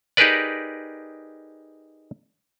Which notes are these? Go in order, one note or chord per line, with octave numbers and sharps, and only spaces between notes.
D#4 G4 G#4 A#4 B4 D5